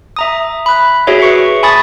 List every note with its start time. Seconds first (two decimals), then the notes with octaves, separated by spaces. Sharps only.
0.16 E5 A#5 D#6
0.66 B5 F#6
1.07 F#4 G#4 C#5 E5
1.22 B4 C#6 C#7
1.63 G#5 A5 B5 C#6 D#6 A6